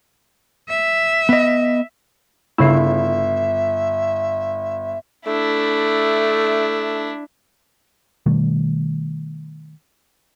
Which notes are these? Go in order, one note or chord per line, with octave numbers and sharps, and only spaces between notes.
E5
B3 D#5
G1 C#3 E4 E5 C7
A3 D4 E4
B2 D#3 G3 A3